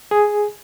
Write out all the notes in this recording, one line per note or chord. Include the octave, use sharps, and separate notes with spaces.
G#4